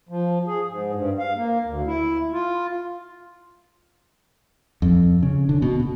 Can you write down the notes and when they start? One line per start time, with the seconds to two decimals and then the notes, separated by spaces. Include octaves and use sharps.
0.09 F3
0.47 G#4
0.67 G#2
0.95 G2
1.18 F5
1.36 A#3
1.65 D2
1.87 E4
2.33 F4
4.82 F2
5.23 C#3
5.49 D3
5.62 B2
5.80 B2